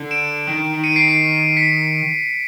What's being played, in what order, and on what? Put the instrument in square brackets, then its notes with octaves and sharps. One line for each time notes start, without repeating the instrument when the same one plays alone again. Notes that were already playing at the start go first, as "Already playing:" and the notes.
Already playing: [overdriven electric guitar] D3
[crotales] D7 E7
[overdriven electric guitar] D#3
[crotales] C#7 D#7
C7 D7
C7 D7
B6 C#7